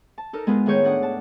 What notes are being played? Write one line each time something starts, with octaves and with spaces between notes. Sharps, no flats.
A5
D#4 A4 A#4
G#3 B3 F4
A2 D#3 G#4 C#5 G6
D4 F#5 D#6
A5